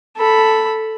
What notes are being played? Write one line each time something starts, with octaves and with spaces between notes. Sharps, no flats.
A4 B5